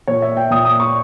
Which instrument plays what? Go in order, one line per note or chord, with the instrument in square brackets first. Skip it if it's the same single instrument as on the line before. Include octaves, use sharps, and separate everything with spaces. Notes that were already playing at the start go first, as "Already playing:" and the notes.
[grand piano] A#2 C#5
E5
G5
A#2 D#6
D#6
C#6